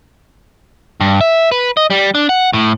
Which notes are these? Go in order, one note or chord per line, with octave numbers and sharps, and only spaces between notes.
G2
E5
B4
D#5
G3
D4
F#5
A2